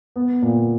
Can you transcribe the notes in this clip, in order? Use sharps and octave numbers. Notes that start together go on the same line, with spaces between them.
B3
A#2